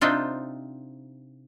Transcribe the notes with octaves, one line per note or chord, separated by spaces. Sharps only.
C3 C4 D4 D#4 F4